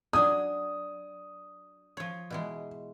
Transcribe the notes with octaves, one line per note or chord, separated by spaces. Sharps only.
F#3 D4 G#5 D#6
F3 C#5
B2 E3 G#3